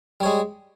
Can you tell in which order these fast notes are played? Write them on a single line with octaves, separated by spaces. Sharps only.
G3 C#5 G#3